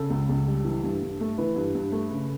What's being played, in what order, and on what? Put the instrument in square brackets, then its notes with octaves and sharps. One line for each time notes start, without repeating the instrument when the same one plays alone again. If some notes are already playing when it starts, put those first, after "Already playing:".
Already playing: [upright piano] C#3 A4
C#2
C#2
G3
E3
G2
G2
A3
E3 B4
G2
G2
A3
C#3